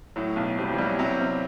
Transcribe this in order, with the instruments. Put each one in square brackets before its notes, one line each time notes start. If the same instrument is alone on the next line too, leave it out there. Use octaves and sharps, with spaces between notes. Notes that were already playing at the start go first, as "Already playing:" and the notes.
[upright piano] A2 [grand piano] F#3
[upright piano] B1
[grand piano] G3 [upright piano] C4
[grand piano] F#3
E3
[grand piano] F#3 [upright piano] G3
[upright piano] C3 [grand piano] F#3
[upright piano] C3